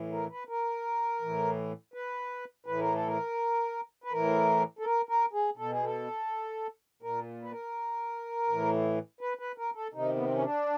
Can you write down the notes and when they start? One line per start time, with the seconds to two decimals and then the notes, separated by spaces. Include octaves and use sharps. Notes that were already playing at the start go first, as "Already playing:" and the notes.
Already playing: A2 E3
0.12 A#4
0.31 B4
0.49 A#4
1.21 A2 E3
1.94 B4
2.66 A2 E3 B4
2.80 A#4
2.94 A4
3.07 A#4
4.04 B4
4.12 A2 E3 A#4
4.79 A4
4.84 A#4
5.09 A#4
5.33 G#4
5.57 B2 A4
5.71 G#4
5.84 A4
7.02 A#2 A#4
7.43 B4
7.51 A#4
8.48 A2 E3
9.21 B4
9.39 B4
9.58 A#4
9.75 A4
9.94 C3 D#3 D#4
10.16 B3
10.24 C4
10.33 C#4
10.42 D4